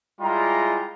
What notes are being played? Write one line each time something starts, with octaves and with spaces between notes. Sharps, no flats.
G3 G#3 E4 F4 D#5 A#5